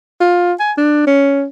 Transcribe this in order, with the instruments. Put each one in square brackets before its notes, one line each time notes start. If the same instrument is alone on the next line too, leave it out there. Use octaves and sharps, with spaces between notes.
[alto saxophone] F4
G#5
D4
C#4